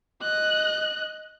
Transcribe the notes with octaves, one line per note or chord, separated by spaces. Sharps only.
D#5 F#6